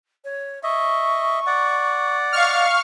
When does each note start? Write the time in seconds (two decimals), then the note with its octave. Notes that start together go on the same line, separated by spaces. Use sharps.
0.25 C#5
0.63 D#5 E5 C#6
1.46 D5 F#5
2.32 D#5 F5 C#6 F6